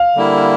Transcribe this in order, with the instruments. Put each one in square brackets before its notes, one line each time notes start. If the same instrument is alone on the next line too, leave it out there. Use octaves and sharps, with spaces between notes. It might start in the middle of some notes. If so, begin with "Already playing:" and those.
Already playing: [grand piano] F5
[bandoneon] D3 G3 A#3 E4